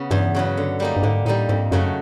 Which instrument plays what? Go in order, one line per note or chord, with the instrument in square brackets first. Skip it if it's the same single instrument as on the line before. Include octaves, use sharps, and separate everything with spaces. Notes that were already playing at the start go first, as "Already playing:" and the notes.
Already playing: [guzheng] C#3 B3
[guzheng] E2 [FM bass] G2
[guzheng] C#3 F#3 B3
D3
G3 A#3 D#4
[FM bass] G2
[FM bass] G#2 [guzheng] D3
[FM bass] A2 [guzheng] G3 A#3 D#4
[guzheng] F2 [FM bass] G#2
[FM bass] F#2 [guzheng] C#3 F#3 A3